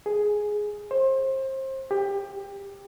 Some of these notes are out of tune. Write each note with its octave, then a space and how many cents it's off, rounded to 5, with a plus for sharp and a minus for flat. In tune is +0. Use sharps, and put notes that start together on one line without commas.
G#4 +5
C5 +30
G4 +20